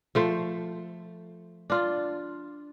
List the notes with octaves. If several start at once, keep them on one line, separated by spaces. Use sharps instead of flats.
F3 A3 C5
D4 F4